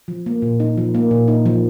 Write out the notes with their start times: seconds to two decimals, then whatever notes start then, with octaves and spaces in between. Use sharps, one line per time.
0.08 F3
0.26 A#3
0.42 A#2
0.60 D#4
0.78 F3
0.95 A#3
1.11 A#2
1.28 D#4
1.46 F3